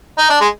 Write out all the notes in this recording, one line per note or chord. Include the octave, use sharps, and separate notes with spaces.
D#4
D4
G#3